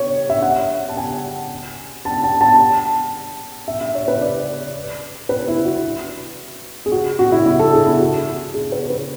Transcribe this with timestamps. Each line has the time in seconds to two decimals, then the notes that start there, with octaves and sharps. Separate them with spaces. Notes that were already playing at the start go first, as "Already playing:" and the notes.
Already playing: C#5
0.30 E5
0.42 F#5
0.89 A5
0.97 G#5
2.05 A5
2.24 A5
2.41 A5
3.68 E5
3.81 E5
3.95 C#5
4.08 B4
4.22 D5
5.29 B4
5.48 E4
5.65 F#4
6.86 G#4
6.92 F#4
7.19 F#4
7.32 E4
7.46 E4
7.59 A4
7.73 G#4
7.86 E4
8.00 F#4
8.54 G#4
8.72 B4
8.90 B4